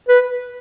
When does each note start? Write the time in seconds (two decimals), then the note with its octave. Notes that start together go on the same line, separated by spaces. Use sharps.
0.09 B4